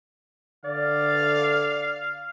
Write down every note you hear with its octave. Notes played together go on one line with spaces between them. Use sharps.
D3 D5 F5